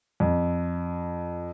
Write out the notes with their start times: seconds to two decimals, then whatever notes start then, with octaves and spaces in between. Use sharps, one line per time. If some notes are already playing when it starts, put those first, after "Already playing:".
0.20 F2